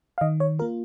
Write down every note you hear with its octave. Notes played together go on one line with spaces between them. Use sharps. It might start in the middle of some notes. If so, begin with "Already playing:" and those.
F5
D#3 D#5
C#5
A#3 F4 A#4